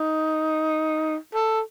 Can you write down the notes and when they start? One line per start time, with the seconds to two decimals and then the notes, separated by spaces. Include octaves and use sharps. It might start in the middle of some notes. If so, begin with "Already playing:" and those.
Already playing: D#4
1.34 A4